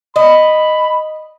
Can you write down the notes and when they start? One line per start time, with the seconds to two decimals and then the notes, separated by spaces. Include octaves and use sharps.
0.16 D#5 B5